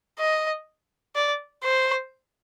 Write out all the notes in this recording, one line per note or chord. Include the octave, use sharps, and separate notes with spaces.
D#5
D5
C5